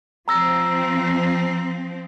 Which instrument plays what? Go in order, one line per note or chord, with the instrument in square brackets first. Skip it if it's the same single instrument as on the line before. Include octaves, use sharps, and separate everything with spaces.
[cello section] F3 C4 [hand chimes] A#5 E6 A#6